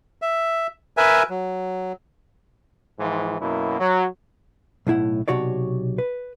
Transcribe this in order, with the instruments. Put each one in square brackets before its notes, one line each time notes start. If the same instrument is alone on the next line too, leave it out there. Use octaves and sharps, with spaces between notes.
[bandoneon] E5
A#4 B4 E5 G#5
F#3
[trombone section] G#2 E3 F3
F#2 B2 A#3 E4
F#3
[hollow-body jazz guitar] B1 A2 E4 F#5
B1 G2 C3 F#4 C#5 D5
B4